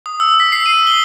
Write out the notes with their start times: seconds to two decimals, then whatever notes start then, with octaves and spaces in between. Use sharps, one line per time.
0.06 D#6
0.20 E6
0.40 B6
0.52 C7
0.66 D#7
0.87 G7